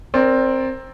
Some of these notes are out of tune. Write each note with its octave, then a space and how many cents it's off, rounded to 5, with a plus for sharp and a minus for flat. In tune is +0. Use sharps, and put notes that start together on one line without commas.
C4 +10 A#4 +0 D5 -10